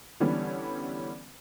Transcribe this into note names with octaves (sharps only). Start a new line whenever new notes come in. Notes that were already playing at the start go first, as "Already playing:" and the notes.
D3 E3 G3 B3 C#4 D4